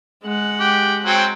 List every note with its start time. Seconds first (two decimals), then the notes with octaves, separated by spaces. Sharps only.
0.23 G#3 F#5
0.60 G4
1.05 F#3 C4 G5